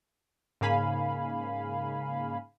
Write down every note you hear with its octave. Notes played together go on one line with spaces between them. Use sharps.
G#2 C#3 A#3 F5 G#5 B5